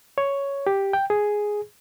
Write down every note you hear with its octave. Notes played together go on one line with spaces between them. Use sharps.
C#5
G4
G5
G#4